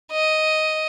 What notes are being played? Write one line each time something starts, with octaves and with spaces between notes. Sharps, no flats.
D#5